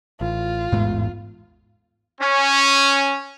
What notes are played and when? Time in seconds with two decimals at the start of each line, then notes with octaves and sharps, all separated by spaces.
0.21 A1 F4
0.72 A1 E2 G#2 G#3 A3
2.20 C#4